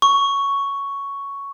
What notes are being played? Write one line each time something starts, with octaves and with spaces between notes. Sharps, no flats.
C#6